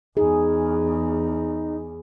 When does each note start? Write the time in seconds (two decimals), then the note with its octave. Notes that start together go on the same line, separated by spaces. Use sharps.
0.17 E2 D#4 G#4